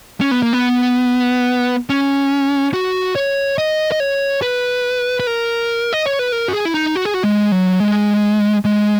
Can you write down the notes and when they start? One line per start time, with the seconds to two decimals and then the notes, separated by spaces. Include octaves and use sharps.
0.21 C#4
0.31 B3
0.42 A#3
0.53 B3
1.89 C#4
2.74 F#4
3.16 C#5
3.58 D#5
3.92 D#5
4.00 C#5
4.42 B4
5.20 B4
5.27 A#4
5.93 D#5
6.06 C#5
6.19 B4
6.32 A#4
6.48 F#4
6.53 G#4
6.65 E4
6.74 D#4
6.96 F#4
7.05 G#4
7.14 F#4
7.24 G#3
7.52 F#3
7.80 G#3
8.65 G#3